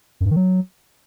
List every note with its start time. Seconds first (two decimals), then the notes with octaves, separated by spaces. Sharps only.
0.21 F#2
0.26 G2
0.31 D#3
0.36 F#3